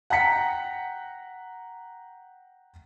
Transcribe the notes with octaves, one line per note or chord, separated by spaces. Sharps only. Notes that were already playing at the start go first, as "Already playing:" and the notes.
F#5 G5 A#5 B6 C#7